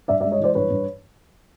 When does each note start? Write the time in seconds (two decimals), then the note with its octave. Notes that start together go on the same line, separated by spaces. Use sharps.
0.08 G2 D5 E5
0.20 D5 E5
0.24 G#3
0.32 C#5 D#5
0.39 E3 C5 D5
0.55 G2 B4 C#5
0.71 G2